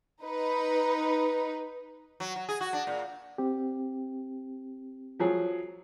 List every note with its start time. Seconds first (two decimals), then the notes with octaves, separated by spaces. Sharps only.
0.23 D#4 B4
2.20 F#3
2.36 F#3
2.49 G#4
2.61 F#4
2.73 D4
2.87 A#2
3.38 C4 G4
5.20 F3 F#3 G#4